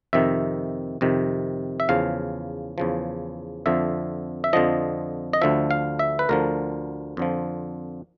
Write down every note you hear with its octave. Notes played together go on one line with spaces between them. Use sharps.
F2 C3 D#3 E5
F2 C3 D#3
E5
E2 C#3 F3 F5
E2 C#3 F3
F2 D3 F3 E5
E5
F2 D3 F3 D#5
D#5
D2 D3 F3 E5
F5
E5
B4
D2 D3 F3 A#4
F2 D3 F3